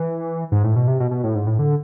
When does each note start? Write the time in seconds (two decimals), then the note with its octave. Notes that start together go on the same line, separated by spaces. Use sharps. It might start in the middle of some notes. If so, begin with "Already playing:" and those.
Already playing: E3
0.52 G#2
0.64 A2
0.76 B2
0.88 C3
1.00 B2
1.11 B2
1.24 A2
1.35 G#2
1.47 A2
1.59 D3